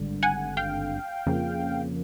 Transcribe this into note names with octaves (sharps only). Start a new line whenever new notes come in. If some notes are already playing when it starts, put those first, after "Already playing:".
Already playing: G#1 G2 D3
F#5 G#5
F5 G5
F2 C#3 F3 A#3